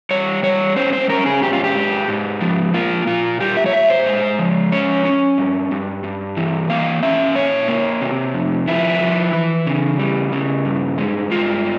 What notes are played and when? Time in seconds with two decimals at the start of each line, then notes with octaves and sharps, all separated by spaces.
0.11 G3 C#5
0.43 G3 C#5
0.76 C#4 C5
0.93 C5
1.09 C#4 A#4
1.26 G#4
1.42 G#2 G4
1.53 F4
1.64 G4
1.75 G#2
2.08 G#2
2.41 F3
2.74 A#3 F4
3.07 A#2 F4
3.40 G3 G4
3.57 E5
3.66 C#5
3.73 A#2 E5
3.90 C5
4.06 G#3
4.39 F3
4.72 C#4 C#5
5.05 C#4
5.38 G2
5.71 G2
6.04 G2
6.37 E3
6.69 A#3 F5
7.02 C#4 E5
7.35 A#2 C#5
7.68 A#3
8.01 C3
8.34 F2
8.67 F3 E4
9.01 F3
9.33 E3
9.67 C#3
9.99 G3
10.32 C#3
10.65 G2
10.98 G#3
11.31 G2 F4